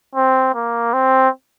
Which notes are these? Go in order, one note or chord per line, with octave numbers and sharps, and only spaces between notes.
C4
A#3
C4